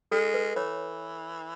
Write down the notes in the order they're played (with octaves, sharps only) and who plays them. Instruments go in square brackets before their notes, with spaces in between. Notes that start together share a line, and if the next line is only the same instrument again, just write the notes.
[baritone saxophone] G#3 [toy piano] A4
[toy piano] B4
[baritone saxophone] E3 [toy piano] C#5